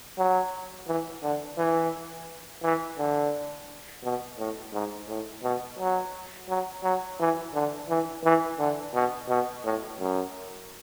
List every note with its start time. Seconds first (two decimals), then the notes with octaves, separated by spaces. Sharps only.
0.18 F#3
0.88 E3
1.23 D3
1.58 E3
2.63 E3
2.98 D3
4.04 B2
4.39 A2
4.73 G#2
5.09 A2
5.44 B2
5.79 F#3
6.49 F#3
6.83 F#3
7.20 E3
7.54 D3
7.89 E3
8.25 E3
8.59 D3
8.94 B2
9.29 B2
9.65 A2
10.00 F#2